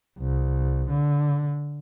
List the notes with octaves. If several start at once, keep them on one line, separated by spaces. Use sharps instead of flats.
C2
D3